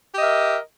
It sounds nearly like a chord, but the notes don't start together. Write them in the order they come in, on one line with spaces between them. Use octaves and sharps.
G4 D#5 E5 A#4